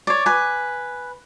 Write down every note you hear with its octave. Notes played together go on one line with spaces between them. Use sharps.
C#5 D5
B4 G#5